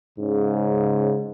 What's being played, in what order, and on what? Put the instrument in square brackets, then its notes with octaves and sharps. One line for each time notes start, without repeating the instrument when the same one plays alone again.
[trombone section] G#2 C#3